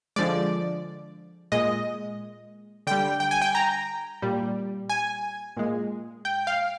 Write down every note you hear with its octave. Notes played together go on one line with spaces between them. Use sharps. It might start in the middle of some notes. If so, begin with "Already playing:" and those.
D3 F3 G#3 D5
A#2 G#3 D#5
D3 G3 G5
G5
G#5
G5
A#5
A#2 G3
G#5
A#2 G#3
G5
F5